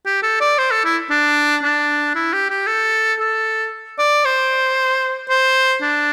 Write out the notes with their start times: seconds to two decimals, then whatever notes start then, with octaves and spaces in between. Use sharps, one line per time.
0.06 G4
0.23 A4
0.40 D5
0.58 C5
0.71 A4
0.85 E4
1.10 D4
1.63 D4
2.15 E4
2.33 G4
2.50 G4
2.67 A4
3.19 A4
3.99 D5
4.25 C5
5.29 C5
5.82 D4